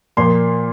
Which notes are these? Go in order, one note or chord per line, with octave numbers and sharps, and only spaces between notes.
A#2 F3 A#3 C6